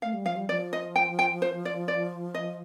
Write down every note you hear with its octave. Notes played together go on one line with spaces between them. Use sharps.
A3 F5
G3
F3 F5
G3
F3 D5
D#5
G5
G5
C5
D5
D5
D#5